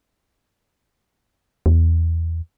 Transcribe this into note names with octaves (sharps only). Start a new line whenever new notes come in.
E2